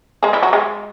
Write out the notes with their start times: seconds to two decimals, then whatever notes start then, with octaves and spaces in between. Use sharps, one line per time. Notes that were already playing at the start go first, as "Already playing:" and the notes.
0.23 G#3 G#4
0.33 E3 E4
0.43 F#3 F#4
0.53 G#3 G#4